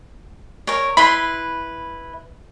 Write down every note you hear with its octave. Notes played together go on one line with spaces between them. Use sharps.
A#4 C#5
E4 B4 B5 C6